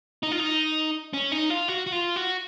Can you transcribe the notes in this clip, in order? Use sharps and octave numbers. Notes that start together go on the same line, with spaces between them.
D#4
F4
D#4
C#4
D#4
F4
F#4
F#4
F4
F#4